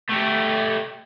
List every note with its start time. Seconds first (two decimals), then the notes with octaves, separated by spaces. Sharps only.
0.10 A3 G4